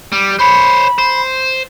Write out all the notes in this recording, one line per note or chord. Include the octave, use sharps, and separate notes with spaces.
G3
C5 C#5 B5
C5